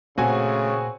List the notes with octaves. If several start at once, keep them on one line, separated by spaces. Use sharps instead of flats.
A#2 C#3 A3 C4 F#4 G#5